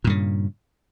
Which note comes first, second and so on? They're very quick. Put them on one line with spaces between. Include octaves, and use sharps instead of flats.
A#2 G2 C#3